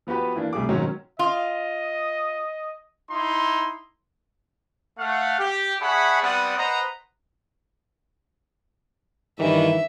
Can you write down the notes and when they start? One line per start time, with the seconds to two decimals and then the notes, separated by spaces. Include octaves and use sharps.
0.07 F3 B3 F#4 G4 B4
0.35 E3 A#3 D4
0.53 C2 G3 A3 G#4 D6
0.69 G#2 B2 D#3 F#3 G#3 C#4
1.19 F4 D#5
3.11 D#4 E4 C6
4.98 A3 F5 F#5
5.39 G4
5.81 D4 G#4 E5 F#5 B5 C#6
6.22 G3 B3 C4 D5 F#5 D#6
6.57 B4 C5 D#5 F#5 A#5
9.39 G2 D#3 E3 E5